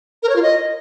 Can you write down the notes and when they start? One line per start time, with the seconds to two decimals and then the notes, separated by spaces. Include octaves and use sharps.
0.23 A#4
0.29 C#5
0.36 F4
0.42 D#5